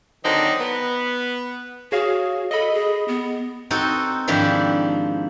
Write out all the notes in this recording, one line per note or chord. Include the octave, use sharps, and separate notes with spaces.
D3 D#3 F#3 C4 D#4
B3
F#4 G#4 C#5 F5
A4 D#5 B5
G#4
B3
C4 D#4 F#4 A4
G#2 D#3 F3 D4 E4 G4